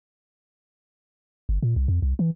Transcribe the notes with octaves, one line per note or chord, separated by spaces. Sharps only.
G1
A#2
C2
F2
C2
E3